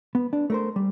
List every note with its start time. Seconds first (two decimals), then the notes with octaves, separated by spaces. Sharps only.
0.15 B3
0.33 D4
0.50 A3 A#4 C5
0.76 G3